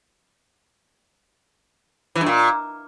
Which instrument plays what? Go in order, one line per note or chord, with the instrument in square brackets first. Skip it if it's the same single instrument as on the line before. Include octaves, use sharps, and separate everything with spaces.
[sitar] E3
G2
A#2